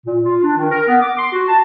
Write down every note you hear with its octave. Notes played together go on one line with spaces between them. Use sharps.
A#2
F4
D4
D#3
A#4
B3
D6
C6
F#4
A5